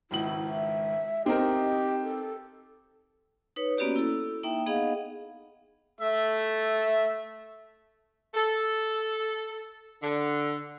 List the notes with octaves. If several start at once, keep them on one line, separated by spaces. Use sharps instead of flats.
G#1 C#2 E4 F#7
E5
C4 D#4 G4 A#4 D#5
A4
D#4 B4 C#5
A#3 B3 C#4 F#4 G4 D5
E4 A4
A#3 D#4 E5 G5
B3 D#4 G#4 D#5 F5 F#5
A3 E5
A4
D3